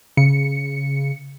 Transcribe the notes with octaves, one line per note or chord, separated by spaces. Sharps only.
C#3 C#7